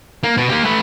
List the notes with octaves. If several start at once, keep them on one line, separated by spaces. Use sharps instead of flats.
A#3
B2
A#3 G4
A3 B4